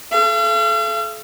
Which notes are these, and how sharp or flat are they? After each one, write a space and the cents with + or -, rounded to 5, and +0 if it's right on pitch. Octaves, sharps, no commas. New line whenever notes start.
A4 -35 F5 -45